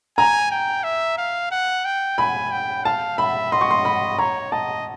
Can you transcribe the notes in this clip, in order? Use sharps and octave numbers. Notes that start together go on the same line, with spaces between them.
G#5 A#5
G5
E5
F5
F#5
G5
G#5 B5
G5
F5 A5
E5 B5
D#5 C6
C#6
C6
B5
C#5 A#5
D#5 A5